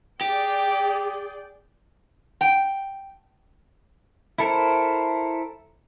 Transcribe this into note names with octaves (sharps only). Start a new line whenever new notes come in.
G4 G#4 D5 G5
G5
E4 A4 A#4 C5